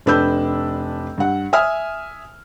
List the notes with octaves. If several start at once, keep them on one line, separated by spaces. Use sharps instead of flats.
F1 D4 B4 E6 G6
G2 F#5
E5 G#5 D#6 F6